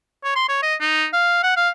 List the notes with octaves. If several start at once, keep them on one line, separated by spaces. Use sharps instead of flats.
C#5
C6
C#5
D#5
D#4
F5
F#5
F5